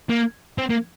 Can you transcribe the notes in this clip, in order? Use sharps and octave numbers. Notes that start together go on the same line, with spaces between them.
A#3
C4
A#3